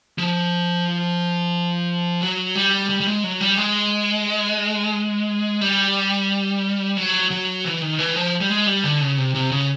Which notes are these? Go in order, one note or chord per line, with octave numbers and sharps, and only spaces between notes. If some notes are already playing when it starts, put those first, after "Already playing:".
F3
F#3
G3
G3
G3
G#3
F#3
G3
G#3
G3
F#3
F#3
E3
D#3
E3
F3
G3
G#3
G3
D3
C#3
C3
C3
C#3